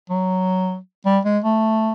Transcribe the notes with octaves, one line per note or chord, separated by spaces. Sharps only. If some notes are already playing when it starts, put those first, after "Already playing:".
F#3
G3
G#3
A3